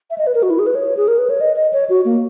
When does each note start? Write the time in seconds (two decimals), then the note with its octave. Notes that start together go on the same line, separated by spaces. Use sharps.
0.10 E5
0.18 D#5
0.27 B4
0.35 A#4
0.43 F#4
0.50 E4
0.59 G#4
0.66 B4
0.75 C#5
0.97 G#4
1.08 A#4
1.18 B4
1.30 C#5
1.41 D#5
1.56 D#5
1.73 C#5
1.89 F#4
2.05 A#3